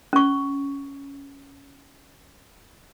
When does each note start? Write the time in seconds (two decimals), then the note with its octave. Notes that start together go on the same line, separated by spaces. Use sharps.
0.13 C#4 C#6